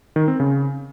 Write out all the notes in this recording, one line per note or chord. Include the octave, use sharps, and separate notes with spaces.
D#3
C4
C#3